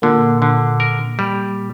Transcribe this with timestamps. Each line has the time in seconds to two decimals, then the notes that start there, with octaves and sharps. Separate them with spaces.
0.02 A#2 D3 A#3
0.42 D3
0.80 A#4
1.19 G3